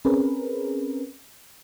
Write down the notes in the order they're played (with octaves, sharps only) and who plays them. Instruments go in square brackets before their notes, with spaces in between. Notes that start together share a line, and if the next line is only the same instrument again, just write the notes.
[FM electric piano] C4 C#4 G#4 A#4 B4